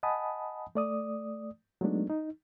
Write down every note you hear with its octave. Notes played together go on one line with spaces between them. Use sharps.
D#5 F#5 G#5 A5 B5 D#6
A3 D5 D#6
F#3 G#3 A3 B3 D4 D#4
D#4